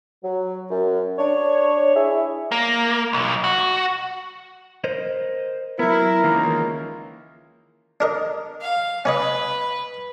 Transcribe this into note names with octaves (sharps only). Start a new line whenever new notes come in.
F#3
F#2
D4 C#5
E4 G#4 E5
A#3
B1
F#4
A#4 C5 D#5
F#3 B3 E4 A#4
C#2 D#3 E3 A#3
D4 A#4 D#5
F5
C#4 B4 C#5 D#5